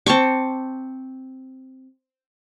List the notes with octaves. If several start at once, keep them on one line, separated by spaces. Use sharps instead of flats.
C4 A5 C#6 D6